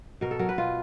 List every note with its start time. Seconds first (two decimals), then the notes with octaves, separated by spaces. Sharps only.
0.21 B2 A#4
0.31 A4
0.39 F#3 A#4
0.49 B4
0.58 B2 F4